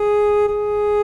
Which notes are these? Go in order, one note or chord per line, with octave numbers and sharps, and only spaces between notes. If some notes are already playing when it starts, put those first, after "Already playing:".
Already playing: G#4
G#4